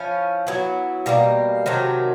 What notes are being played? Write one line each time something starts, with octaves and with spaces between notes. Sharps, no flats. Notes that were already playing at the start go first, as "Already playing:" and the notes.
Already playing: F3 C#4 E4
F#3 B3 E4
B2 G3 A#3
C3 D#3 F#3 A3